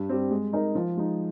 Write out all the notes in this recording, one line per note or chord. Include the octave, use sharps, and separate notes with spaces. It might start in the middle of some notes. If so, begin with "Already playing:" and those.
Already playing: G2
G3 C4 G4
G#3
D#4 A#4 D#5
F3
G#3 D#4